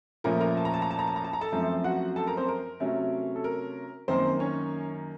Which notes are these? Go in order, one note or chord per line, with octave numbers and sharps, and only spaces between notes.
A#2 F3 A3 C#4 A#4 A#5
A#4 A#5
A5
A#5
A5
A#5
A5
A#5
A5
A#5
A5
A#5
A4 A5
F#2 F3 A3 C4
F#4 F#5
A4 A5
A#4 A#5
C4 C5
A#4
C3 F#3 A3 C#4
A4
A#4
F#2 D#3 A#3 C4 C5
C#4 C#5